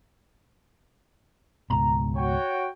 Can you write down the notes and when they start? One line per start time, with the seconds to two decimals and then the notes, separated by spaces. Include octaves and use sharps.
1.70 C#2 G#2 B2 A#5
2.16 F#4 C#5 G5